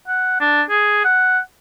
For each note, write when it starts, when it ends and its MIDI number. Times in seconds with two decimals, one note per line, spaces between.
0.08 0.37 78
0.40 0.62 62
0.69 1.02 68
1.04 1.39 78